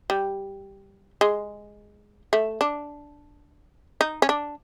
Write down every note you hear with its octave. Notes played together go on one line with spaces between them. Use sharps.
G3
G#3
A3
D4
D#4
C#4
D4